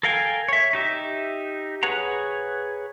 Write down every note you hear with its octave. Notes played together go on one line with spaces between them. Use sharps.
A4 A#4 F5 G5 G#5
C#5 E5
D#4 G4 E5
G#4 B4 C#5 F#5 A#5